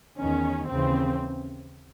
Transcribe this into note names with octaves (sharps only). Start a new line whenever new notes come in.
E2 D#3 C#4
D#2 C#3 E3 C4